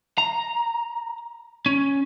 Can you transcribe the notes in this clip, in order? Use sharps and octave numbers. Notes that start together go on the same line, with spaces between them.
A#5
C#4